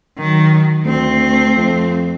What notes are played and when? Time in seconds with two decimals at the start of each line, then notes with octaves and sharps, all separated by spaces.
0.18 D#3 F#3
0.85 D2 A3 C4
1.56 F2